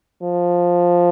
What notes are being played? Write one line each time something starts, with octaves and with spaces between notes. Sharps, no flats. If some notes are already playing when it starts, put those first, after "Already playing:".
F3